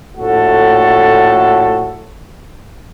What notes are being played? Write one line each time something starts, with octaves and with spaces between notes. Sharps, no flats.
A#1 A2 F#4 A4